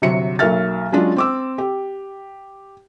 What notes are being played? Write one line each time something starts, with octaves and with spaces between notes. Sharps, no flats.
G1 C3 F#3 E5 C#7
B1 F#3 A#3 E5 F6 A6
F#3 G#3 C#4 D4 F4
C4 D6 E6
G4